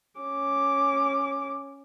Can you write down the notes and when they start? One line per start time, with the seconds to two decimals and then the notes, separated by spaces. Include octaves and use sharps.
0.20 C#4 D6